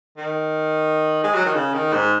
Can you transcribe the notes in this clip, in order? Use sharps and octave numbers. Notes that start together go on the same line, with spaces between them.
D#3
G#3
F#3
D#3
C#3
D#3
G#2